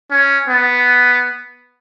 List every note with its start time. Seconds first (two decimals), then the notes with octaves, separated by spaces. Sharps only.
0.11 C#4
0.49 B3